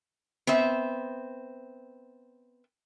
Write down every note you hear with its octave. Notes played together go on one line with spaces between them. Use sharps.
B3 C4 E5